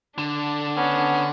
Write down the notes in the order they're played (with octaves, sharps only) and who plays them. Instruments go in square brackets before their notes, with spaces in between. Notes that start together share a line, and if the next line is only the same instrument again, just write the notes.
[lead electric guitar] D3 [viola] D4
[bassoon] B3 [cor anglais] C#4